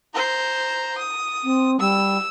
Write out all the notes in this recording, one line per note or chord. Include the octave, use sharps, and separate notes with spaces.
C5 A#5
D#6
C4
G3 E6